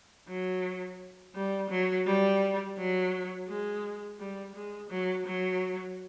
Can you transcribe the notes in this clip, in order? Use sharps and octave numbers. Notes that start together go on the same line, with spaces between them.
F#3
G3
F#3
G3
F#3
G#3
G3
G#3
F#3
F#3